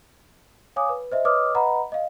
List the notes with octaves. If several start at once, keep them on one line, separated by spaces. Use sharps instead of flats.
C#5 F5 G#5 D6 D#6
B4
C5 D#5 E5
B4 C#5 D#5 D6 D#6 F6
B4 D#5 F#5 A#5 B5
D#5 F5